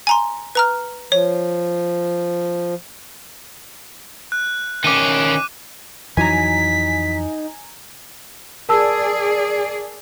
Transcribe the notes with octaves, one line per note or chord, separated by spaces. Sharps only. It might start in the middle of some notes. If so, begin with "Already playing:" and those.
G#5 A#5 C6
B4 A#5 F6
F3 C#5
F#6
D#3 C#4 D6 D#7
F2 E3 F#3 D#4 G#5 A#5 B6
G#4 A#4 D5 A5 E6